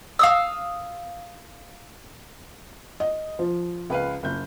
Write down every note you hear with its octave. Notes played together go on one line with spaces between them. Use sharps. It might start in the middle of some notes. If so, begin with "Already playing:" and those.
F5 D#6 E6
D#5
F3
C#2 B4 F5
F#1 G6